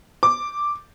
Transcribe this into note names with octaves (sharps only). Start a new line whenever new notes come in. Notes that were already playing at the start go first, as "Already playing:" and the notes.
D6